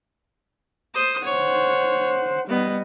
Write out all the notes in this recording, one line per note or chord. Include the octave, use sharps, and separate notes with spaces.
C5 D#6
C5 C#5 F#5
G3 B3 D#5